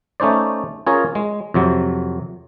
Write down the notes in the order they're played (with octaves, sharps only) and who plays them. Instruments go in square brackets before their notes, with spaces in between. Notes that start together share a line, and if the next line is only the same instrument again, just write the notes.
[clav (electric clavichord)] A3 C#4 D#4 C5 D5
C#4 F4 G#4 A#4 C#5
G#3
F2 C3 F#3